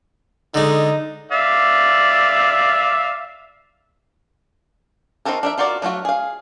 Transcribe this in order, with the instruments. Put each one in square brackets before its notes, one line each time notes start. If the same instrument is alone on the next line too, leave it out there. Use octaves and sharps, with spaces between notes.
[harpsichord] D3 G#3 [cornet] D#4
[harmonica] D5 E5 F5
[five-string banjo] C4 D#4 F#4 A4 A#4
D4 A#4 E5
D4 F4 F#4 A#4 D5
F#3 A3 F4 F#4
G#4 F5